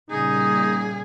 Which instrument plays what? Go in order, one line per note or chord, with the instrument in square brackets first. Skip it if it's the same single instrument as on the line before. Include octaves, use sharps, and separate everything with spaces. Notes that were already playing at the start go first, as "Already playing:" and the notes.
[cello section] A#2 C#3 G3 [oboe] D#4 [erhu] G#4